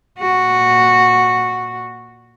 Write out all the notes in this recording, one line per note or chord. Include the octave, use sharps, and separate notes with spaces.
A#2 F#4